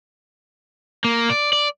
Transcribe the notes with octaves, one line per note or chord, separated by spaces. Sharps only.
A#3
D5
D5